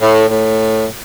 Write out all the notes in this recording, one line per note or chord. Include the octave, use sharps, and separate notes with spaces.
A2
A2